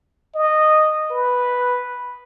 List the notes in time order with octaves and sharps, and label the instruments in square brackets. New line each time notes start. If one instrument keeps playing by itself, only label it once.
[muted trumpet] D#5
B4